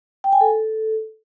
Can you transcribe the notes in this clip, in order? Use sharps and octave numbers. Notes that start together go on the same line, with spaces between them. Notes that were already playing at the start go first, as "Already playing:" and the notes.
G5
G#5
A4